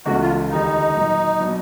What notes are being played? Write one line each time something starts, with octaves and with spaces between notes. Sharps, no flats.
C#2 C#3 E3 A3 F#4
F4
D#2 D3 G3 D#4
A#2 F#3 A#3
B2 F#3 B3 D4